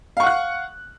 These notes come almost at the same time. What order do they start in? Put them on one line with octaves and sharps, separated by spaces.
F5 C#6 F#5 F#6